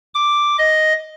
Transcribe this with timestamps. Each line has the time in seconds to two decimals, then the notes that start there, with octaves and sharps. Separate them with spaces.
0.14 D6
0.58 D#5